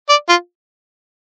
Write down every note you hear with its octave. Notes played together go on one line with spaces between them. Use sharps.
D5
F4